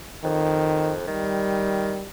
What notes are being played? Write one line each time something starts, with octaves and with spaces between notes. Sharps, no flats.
F2 D#3
D#3 G3